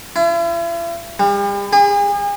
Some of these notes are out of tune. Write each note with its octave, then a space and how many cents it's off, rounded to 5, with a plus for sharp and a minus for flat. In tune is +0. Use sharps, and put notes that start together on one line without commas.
E4 +45
G3 +40
G#4 -40